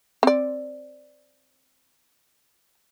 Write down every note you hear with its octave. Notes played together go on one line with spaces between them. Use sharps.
C4 D5